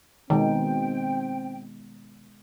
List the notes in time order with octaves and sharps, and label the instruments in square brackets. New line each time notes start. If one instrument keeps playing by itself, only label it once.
[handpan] B2 G#3 [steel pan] D#3 [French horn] C4 [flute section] G5